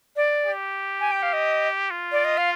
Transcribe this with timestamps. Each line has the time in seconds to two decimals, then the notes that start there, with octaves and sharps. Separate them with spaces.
0.16 D5
0.46 G4
1.00 G#5
1.11 G5
1.23 F5
1.33 D#5
1.91 F4
2.12 D5
2.25 D#5
2.37 F5